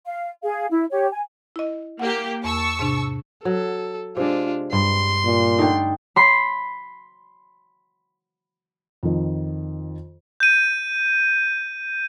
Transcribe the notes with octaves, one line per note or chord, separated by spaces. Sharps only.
F5
G#4 F5
E4
G4 C#5
G#5
E4 D#5
A#3 G4 F#5
E2 A5 C#6 E6
G#2 C3 D4
F#3 A4
C3 G#3 D4 F4
G2 C6
A#2
D3 A3 D#4 G5
B5 C6 C7
F2 D#3
G6 D#7